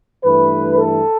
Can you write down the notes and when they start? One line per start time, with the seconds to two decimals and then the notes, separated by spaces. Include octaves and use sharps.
0.24 G2 E3 A3 B4
0.79 A4